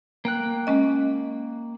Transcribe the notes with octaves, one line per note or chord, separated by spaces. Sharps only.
A#3 G5 F#6
G#3 C#4 D#5